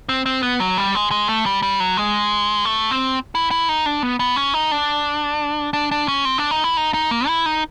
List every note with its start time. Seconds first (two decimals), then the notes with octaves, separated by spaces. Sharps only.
0.09 C4
0.26 C4
0.43 B3
0.60 F#3
0.78 G3
0.95 G#3
1.11 G#3
1.29 A3
1.46 G3
1.62 G3
1.80 F#3
1.97 G#3
2.65 A3
2.91 C4
3.35 E4
3.51 E4
3.69 D#4
3.86 D4
4.03 B3
4.20 B3
4.36 C#4
4.54 D#4
4.71 D4
5.73 D4
5.92 D4
6.08 C#4
6.25 C4
6.38 D4
6.51 D#4
6.64 E4
6.77 D#4
6.94 D#4
7.11 A#3
7.27 E4
7.46 D#4